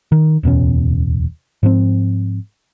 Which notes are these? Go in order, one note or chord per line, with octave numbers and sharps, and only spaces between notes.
D#3
D1 E2 B2 C#4
G#2 F3 C4